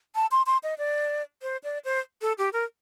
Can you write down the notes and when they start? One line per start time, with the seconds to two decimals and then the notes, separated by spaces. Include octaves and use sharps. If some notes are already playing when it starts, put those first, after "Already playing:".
0.15 A5
0.31 C6
0.46 C6
0.63 D#5
0.78 D5
1.42 C5
1.64 D5
1.85 C5
2.21 A4
2.38 G4
2.53 A#4